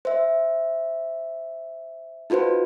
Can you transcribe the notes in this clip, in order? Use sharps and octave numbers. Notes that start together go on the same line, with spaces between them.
C5 E5
D#4 F4 F#4 B4 C5